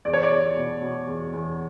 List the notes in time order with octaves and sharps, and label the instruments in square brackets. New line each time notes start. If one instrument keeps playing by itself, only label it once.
[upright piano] E2 D5
C#5
D5
E2
B2
B2
E2
E2